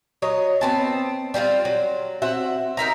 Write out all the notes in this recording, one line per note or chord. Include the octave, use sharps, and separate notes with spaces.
F#3 C#5 D#5
B3 C4 A5
G3 C4 D#4 F4
F#3
C4 F#4 E5 F#5
D#4 A#4 E5 A#5